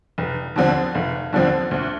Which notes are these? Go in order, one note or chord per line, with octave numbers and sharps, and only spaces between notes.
F1
D#2 D3 F3 C4
F1
D#2 D3 F3 C4
D2